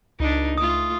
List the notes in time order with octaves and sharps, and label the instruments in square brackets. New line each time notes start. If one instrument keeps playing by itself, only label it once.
[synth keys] C#2 [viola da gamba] D4 D#4
[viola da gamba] A3 F4 [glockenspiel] D#6